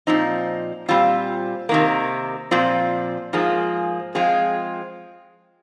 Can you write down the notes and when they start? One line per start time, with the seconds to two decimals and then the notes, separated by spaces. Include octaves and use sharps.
0.07 A#2 F3 C4 D#4
0.88 A#2 G3 C4 F4
1.69 C3 D#3 A#3
2.51 A#2 F3 C4 F4
3.33 G#2 F3 A#3 F4 G#4
4.15 F3 G#3 C4 F4 G#4